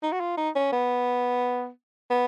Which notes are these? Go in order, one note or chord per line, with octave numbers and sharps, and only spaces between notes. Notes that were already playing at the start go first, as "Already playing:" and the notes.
D#4
F#4
F4
D#4
C#4
B3
B3